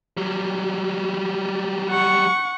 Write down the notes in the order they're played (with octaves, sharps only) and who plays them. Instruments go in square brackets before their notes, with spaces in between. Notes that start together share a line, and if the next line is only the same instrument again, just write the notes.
[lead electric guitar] F#3 G3
[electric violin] F#5 C#6